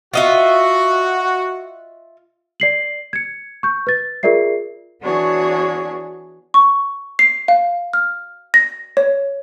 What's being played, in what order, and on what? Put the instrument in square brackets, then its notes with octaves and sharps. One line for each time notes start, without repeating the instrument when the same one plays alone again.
[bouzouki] F4 D#5 E5 [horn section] F#4
[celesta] D5 C7 F#7
G#6 C#7
C#6 G6
B4 A6
F4 G#4 A#4 D5 E5 C7
[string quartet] E3 B3 D4 F#4 G#4 C#5
[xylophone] C#6
C7
F5
F6
A#6
C#5